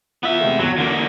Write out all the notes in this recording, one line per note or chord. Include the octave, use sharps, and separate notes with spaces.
B3 E4 F4 E5
C3 G#3 A3
B1 E2 F#3
D3 E3 A#3 C#4